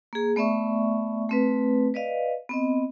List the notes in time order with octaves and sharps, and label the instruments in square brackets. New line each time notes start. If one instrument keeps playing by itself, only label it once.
[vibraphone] A#3 G#4
A3 B3 D5 E5 C#6
A3 C4 B4
B4 D5 D#5 F5
B3 C4 D#5